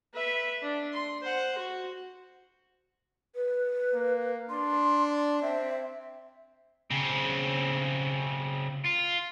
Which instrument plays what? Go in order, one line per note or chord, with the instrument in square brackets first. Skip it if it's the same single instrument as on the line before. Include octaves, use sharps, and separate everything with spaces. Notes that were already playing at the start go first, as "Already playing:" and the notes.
[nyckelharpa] B4 E5
D4
C6
C5 F#5
F#4
[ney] B4
[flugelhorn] A#3
[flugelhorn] D4 [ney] C6
[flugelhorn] C4 [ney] E5
[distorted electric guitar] C#3 C4
F4